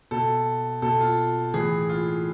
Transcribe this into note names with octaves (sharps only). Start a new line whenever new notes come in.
B2 A4
B2 A4
F4
A2 E3 G#4
F4